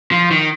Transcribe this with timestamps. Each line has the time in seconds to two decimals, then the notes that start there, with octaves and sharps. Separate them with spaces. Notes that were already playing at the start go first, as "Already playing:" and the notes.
0.12 F3
0.31 D#3